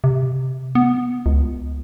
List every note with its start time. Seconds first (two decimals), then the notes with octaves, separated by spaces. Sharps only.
0.04 C3
0.75 B3
1.26 C#2